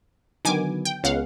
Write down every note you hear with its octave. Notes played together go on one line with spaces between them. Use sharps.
D3 D#3 F#3 B3 G#5 D6
G5
C#2 B3 C#4 F5 F#5